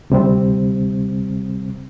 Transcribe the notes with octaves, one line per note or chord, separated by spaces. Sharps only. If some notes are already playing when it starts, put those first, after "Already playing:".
D2 C3 G3 C4